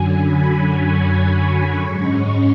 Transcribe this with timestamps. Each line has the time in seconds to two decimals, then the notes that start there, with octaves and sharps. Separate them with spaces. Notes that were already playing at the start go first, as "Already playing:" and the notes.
Already playing: F#2 D3 F#3 G#5
0.13 B5
0.68 C#6
1.23 C#6
1.79 G#2 G#3 C#4 C#6